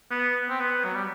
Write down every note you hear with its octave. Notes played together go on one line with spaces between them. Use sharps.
B3
C4
B3
F#3
G3